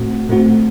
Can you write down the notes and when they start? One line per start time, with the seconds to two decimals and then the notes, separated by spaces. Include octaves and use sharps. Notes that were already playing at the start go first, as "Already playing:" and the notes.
Already playing: A2 A3 C4 F#4
0.29 A2 A3 C4 F#4